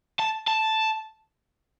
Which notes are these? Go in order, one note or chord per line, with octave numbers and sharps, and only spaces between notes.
A5
A5